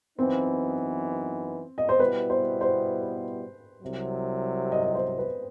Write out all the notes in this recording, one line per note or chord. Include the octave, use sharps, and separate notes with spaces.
F#2 E3 B3 C4 D#4
D#5
C5
B2 G3 B3 E4 B4
C5
C5
C2 C3 F#3
D#5
D#5
C5
B4